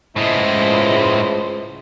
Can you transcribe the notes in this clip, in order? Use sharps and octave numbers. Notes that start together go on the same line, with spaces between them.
C#2 A2 G#3 E4 C5 D#5